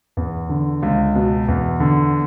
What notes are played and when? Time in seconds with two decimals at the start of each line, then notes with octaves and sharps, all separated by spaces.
0.17 E2
0.49 D3
0.83 C#2
1.15 B2
1.48 E2
1.80 D3